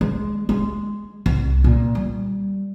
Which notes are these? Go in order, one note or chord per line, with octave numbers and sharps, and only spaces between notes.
G#3
G#3
C2
A#2
G3